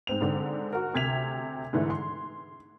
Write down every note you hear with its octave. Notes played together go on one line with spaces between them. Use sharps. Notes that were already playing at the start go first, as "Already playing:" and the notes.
G#2 C4 F7
G#2 D3 C4
F#4 A#4
D2 C3 G#6 B6 F7
G#2 D3 E3 G#3 A3
C6